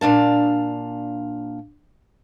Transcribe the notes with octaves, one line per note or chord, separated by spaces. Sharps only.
A#2 D4 F5 A5